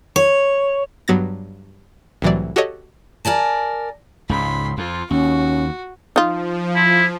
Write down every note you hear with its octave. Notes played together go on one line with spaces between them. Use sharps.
C#5
G2 F#3 B3 A6 A#6
C2 A2 E3 F#3 D5
F#4 G4 A4 C#5 D#5
A#4 D5 G#5 A5
C#2 G#2 B5 C6
F2 F4
D#2 C#4 F#4
F3 D#4 F4
E4